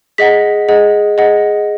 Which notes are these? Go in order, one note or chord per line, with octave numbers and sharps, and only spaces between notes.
G#4 D#5 F#5 B6
G#4 D#5 F#5
G#4 D#5 F#5